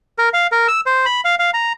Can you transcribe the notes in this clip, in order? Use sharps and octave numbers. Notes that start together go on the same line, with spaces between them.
A#4
F5
A#4
E6
C5
B5
F5
F5
A#5